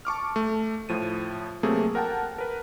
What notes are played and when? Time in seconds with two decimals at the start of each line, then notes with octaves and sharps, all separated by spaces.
0.05 A5 C#6 D6 F6
0.36 A3
0.89 A2 F3 D#7
1.63 C3 F#3 A3 A#3 C4 G#4
1.95 A#4 F#5 G5 A5
2.38 A#4 B4